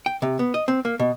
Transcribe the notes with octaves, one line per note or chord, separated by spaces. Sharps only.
G5
C3
B3
D#5
C4
A#3
B2